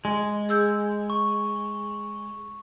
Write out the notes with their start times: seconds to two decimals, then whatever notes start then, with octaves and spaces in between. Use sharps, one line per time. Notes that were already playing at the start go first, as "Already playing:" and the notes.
0.05 G#3
0.49 G#4 E6 G6
1.10 C#6